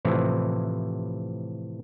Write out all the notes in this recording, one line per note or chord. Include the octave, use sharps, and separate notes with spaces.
A2 C3 E3 F3